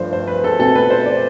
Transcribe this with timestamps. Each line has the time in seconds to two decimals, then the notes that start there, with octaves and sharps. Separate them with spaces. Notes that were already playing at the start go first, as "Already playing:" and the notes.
Already playing: G2 F3 A3 C5
0.13 C5
0.28 B4
0.44 A4
0.59 B2 A3 C4 A4
0.75 B4
0.90 C5
1.06 D5